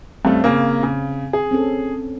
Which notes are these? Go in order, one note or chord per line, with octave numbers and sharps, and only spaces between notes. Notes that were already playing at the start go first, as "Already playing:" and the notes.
G2 A3 C4 C#4 F5
C#3 A#3
C#3
G#4
C4 C#4 A4